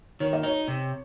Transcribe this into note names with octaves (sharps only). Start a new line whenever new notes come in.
D#3 C#5
D#5
D#4 C#5
C3